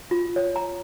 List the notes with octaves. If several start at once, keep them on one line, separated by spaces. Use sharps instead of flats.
F4
C#5
A#5